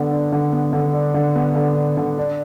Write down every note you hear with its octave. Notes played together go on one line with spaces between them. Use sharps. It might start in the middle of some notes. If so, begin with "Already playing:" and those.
Already playing: D3 B3
D4
D3
B3
D3
D4
D3
B3
D3
D4
D3
D4